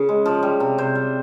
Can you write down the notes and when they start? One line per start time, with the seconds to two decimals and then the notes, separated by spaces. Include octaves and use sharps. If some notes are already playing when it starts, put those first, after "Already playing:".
Already playing: C#3
0.09 G#3
0.26 F3
0.43 G3
0.60 C3
0.78 C3 C5
0.95 G3